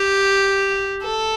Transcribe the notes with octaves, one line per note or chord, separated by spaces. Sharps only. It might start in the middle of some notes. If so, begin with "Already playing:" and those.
Already playing: G4
A4